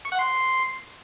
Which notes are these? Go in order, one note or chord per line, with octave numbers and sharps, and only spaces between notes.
C#6
F#5
C6